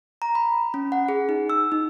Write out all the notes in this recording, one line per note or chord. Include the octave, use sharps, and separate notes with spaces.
A#5
B5
C#4
F#5
G#4
D#4
E6
D#4